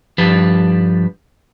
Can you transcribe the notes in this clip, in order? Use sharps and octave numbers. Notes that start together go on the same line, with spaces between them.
G2 F3 D4 G4 B4